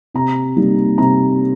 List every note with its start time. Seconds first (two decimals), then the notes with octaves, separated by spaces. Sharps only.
0.14 C3 A#5
0.57 G3 A#3 D#4
0.98 C3 A#5